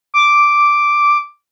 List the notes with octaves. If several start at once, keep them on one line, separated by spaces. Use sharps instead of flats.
D6